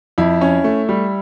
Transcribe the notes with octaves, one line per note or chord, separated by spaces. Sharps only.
F2 E4
C#4
A3
G3